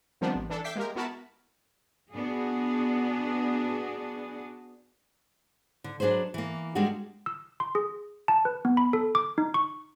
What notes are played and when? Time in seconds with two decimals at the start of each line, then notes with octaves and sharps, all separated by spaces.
0.21 D#3 F3 G3 B3 C4 D4
0.35 A1
0.50 E3 D4 A4
0.64 E5 G5 D6 B6 C7
0.76 G#3 A#3 G4 A#4
0.95 B3 E4 F#4 A#4 A5 B5
2.12 B3 D4 F#4 G#4
5.84 D3
6.00 F#3 D4 G#4 B4 C5
6.34 E3 A#3
6.75 G3 G#3 A#3 D4 F#4 G4
7.26 E6
7.60 C6
7.75 G#4
8.28 A5
8.45 B4
8.65 B3
8.77 B5
8.93 A4
9.15 D6
9.38 D#4
9.54 C#6